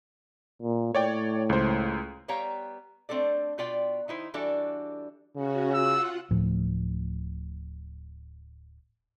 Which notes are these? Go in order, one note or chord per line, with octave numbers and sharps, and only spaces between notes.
A#2
A2 C#5 D5 G5
C#2 C5
G3 B3 C#5 F5 G5 A#5
A3 C4 D4 A4 D5
B2 F4 D5 G5
D#3 D#4 E4 C5
E3 G3 D4 F#4 A4
C#3 C#4 F#4
F4 F#5 E6
D1 A2 F3